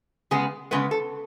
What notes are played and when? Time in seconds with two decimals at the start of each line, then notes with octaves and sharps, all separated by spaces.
0.31 C#3 G#3 B3 G#4
0.71 C#3 G#3 B3 B4
0.91 A4